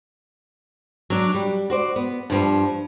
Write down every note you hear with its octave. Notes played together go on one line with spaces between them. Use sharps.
F#3 D4
G3
F#4 C5 D5
B3
G2 F3 G3